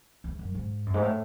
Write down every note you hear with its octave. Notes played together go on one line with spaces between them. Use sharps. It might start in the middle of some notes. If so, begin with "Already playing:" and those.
E2
F#2
G#2
F#2
G#2
A2